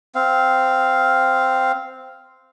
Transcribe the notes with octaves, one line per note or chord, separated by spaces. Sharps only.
C4 F5